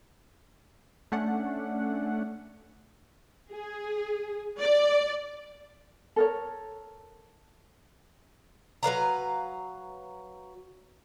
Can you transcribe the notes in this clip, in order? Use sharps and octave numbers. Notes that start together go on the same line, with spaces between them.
A3 C#4 D4 F#5
G#4
D5
A4 A#4 C#5
F#3 B4 F5 A#5